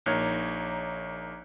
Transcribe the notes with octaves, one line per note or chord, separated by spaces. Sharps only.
A#1 A#3 D#4 C#5